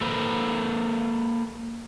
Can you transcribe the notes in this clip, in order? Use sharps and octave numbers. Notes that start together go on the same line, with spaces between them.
A#3 A4 B4 C5